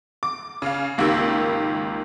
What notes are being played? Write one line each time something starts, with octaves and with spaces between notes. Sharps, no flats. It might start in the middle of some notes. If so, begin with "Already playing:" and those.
D6
C#3 F5
G#1 C#2 D#3 A#3 G4 E6